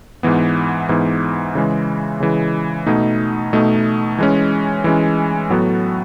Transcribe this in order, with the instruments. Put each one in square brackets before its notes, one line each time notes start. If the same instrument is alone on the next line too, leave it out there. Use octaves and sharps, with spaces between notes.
[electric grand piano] G#2 E3 B3
G#2 E3 B3
C#3 E3 G#3
C#3 E3 G#3
B2 A3 D#4
B2 A3 D#4
E3 G#3 C#4
E3 G#3 C#4
A2 F#3 B3 F#4 A4